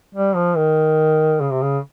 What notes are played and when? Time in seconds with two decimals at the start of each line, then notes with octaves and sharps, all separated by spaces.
0.15 G3
0.35 F3
0.57 D#3
1.40 C#3
1.51 C3
1.62 C#3